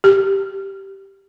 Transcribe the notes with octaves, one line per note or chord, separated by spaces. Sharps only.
G4